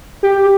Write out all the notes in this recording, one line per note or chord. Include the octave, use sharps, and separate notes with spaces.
G4